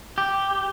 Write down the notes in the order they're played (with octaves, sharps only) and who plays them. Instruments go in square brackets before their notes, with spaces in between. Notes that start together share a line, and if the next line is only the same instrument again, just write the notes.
[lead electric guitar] G4